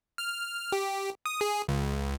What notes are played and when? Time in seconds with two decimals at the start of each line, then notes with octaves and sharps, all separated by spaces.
0.18 F6
0.72 G4
1.26 D#6
1.41 G#4
1.68 C#2